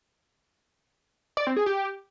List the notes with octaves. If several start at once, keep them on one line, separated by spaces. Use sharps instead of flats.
D5
C4
G#4
G4